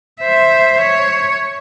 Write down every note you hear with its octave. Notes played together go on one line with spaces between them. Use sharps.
C5 E5
C#5